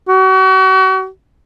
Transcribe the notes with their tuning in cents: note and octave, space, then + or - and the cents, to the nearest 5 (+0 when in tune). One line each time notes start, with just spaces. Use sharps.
F#4 +35